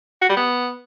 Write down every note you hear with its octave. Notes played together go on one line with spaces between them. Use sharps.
F#4
G3
B3